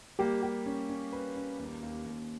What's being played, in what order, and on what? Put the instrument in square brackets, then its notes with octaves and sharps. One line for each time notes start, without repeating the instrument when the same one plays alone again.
[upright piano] G3 A#3 [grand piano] G4
[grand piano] G4
C#4
C#4
B4
C#4
D#2
D#2
D#2